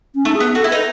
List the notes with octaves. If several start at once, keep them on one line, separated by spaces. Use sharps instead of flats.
C#4
A3 D#4
G#4
B3
F#4 A4
E4
D#4 B4